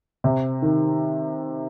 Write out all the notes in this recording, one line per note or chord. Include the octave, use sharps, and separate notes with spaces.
C3
D#3